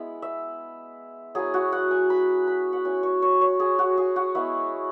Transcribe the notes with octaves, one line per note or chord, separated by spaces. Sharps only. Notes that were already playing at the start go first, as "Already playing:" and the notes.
Already playing: G#3 B3 E4
E5
F#3 B3 E4 G#4
F#4
F#5
G#5
B5
B5
F#5
F#3 C#4 E4 G#5
C#5
C#5
C#5
G#4
F#4
G#4
F#4
G#3 B3 E4